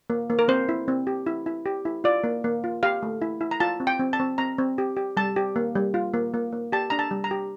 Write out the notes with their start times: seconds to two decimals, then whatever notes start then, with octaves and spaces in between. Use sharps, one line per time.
0.10 A#3
0.30 A#3
0.39 A#4
0.48 C4 C5
0.69 E4
0.88 C4
1.07 G4
1.26 E4
1.46 E4
1.66 G4
1.85 E4
2.04 F4 D5
2.24 A#3
2.44 A#3
2.64 F4
2.83 G4 F5
3.03 A3
3.22 E4
3.41 E4
3.51 A#5
3.60 F4 A5
3.80 C4
3.87 G5
4.00 C4
4.13 A5
4.20 C4
4.38 C4 A#5
4.58 C4
4.78 G4
4.96 G4
5.17 G3 A5
5.36 G4
5.56 A#3
5.75 G3
5.94 F4
6.14 A#3
6.34 A#3
6.52 A#3
6.72 G4 A5
6.90 D4 A#5
6.99 A5
7.11 G3
7.24 A#5
7.31 G4